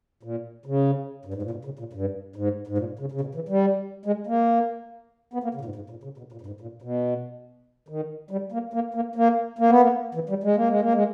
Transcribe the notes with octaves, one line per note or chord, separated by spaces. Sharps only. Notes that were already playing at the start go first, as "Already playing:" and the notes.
A#2
C#3
G2
G#2
A#2
B2
C#3
A#2
G2
G#2
G#2
A#2
C#3
C#3
B2
E3
G3
G#3
A#3
B3
A#3
C#3
A#2
G#2
G#2
A#2
C#3
B2
A#2
G2
G#2
A#2
B2
D#3
G3
A#3
A#3
A#3
A#3
A#3
B3
A#3
E3
G3
G#3
A#3
G#3
A#3
G#3